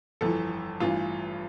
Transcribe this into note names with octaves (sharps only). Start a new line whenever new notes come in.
G1 F2 E3 A4
A1 G2 E3 F4